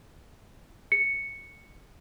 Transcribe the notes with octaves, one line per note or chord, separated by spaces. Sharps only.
C#7